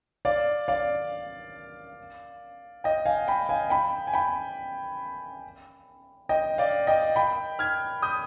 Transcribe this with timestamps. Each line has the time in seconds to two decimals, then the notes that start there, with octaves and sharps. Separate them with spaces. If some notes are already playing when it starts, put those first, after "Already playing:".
0.25 D5 F5
0.68 D5 F5
2.84 D#5 G5
3.06 F5 G#5
3.28 G5 B5
3.49 F5 G#5
3.70 G5 B5
4.07 G#5
4.13 G5 B5
6.29 D#5 G5
6.58 D5 F5
6.87 D#5 G5
7.16 G5 B5
7.59 F6 G#6
8.02 D#6 G6